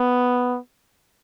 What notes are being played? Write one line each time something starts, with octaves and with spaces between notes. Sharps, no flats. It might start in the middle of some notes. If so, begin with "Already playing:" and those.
Already playing: B3